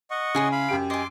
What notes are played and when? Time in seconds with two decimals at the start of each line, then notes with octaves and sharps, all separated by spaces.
0.10 D#5 F#5 C#6
0.35 C#3 E4 G#4 C6
0.52 F5 B5
0.69 F#2 G4 D7
0.90 D#5 G#5 C6 D6